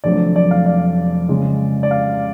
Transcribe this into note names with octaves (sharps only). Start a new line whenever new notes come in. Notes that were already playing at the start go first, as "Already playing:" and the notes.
F1 F2 D3 F#3 A3 D5
D5
F5
D5
C#2 C#3 G#3
D5
F5